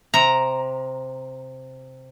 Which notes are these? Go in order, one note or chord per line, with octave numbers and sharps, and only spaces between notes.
C3 A#5